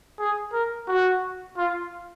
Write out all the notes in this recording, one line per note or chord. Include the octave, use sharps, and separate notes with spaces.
G#4
A#4
F#4
F4